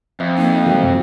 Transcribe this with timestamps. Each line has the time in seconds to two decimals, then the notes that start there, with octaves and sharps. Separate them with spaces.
0.20 F2 E5
0.38 A#3 D#4
0.66 E3 F#3 G#3 F#4 A#4 G5
0.82 F#2 C3